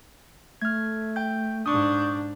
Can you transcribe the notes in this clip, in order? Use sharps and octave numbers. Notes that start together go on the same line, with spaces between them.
A3 F6 G#6
G5 G6
G#2 D4 C#6 D#6 G6